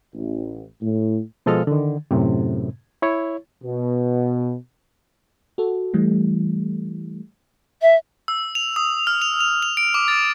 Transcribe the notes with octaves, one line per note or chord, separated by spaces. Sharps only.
A1
A2
B2 F3 G#3 A4 D#5 F6
D3 D#3
F#2 A2 C3
E4 C#5
B2
F#4 A4
E3 G3 A3
E5
E6
F7
D#6
F6
F7
F7
F7
D7
D6
A6